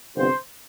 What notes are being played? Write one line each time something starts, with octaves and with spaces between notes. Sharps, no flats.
G1 F2 C3 C5